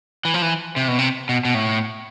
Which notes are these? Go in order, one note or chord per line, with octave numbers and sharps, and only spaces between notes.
E3
F3
E3
C3
B2
C3
B2
B2
A2